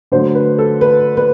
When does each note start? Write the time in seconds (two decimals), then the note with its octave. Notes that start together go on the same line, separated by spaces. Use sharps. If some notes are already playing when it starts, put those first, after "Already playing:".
0.12 D3 F#3 A3 C5
0.35 B4
0.59 A4
0.81 B4
1.17 B4